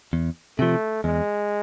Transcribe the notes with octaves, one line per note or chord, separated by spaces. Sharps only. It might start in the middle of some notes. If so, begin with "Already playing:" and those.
E2
C3 F3 A3
E2 G#3